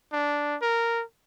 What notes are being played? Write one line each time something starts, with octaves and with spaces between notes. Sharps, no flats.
D4
A#4